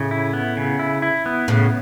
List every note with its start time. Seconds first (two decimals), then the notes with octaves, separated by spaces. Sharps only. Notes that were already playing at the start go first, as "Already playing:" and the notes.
Already playing: A2 C#3
0.11 E4
0.33 B3
0.57 C#3
0.79 E4
1.02 E4
1.26 B3
1.48 A2 C#3